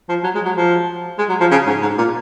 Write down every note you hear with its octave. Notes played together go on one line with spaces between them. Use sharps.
F3
F#3
G#3
F#3
F3
G#3
F#3
F3
C#3
G#2
G#2
A#2